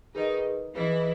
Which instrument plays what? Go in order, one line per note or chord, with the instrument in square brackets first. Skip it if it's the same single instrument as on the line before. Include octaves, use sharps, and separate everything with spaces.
[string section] D#3 D#4 [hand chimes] G#4 B4 D#5
[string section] E3 E4 [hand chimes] G#4 B4 D#5